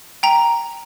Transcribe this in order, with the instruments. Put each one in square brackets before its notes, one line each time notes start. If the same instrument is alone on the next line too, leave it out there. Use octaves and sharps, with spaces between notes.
[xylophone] G5 A#5